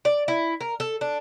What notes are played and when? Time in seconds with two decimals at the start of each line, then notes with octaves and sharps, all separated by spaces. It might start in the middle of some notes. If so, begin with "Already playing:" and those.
0.05 D5
0.28 E4
0.61 A#4
0.80 A4
1.01 D4